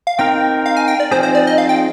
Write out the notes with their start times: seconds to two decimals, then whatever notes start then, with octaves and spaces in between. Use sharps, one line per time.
0.07 F5
0.19 C4 D#4 A#4 G5
0.66 F5
0.77 G#5
0.88 G5
1.00 D5
1.11 F3 C4 D#4 G#4 C5
1.23 C5
1.35 D5
1.47 D#5
1.58 F5
1.69 G5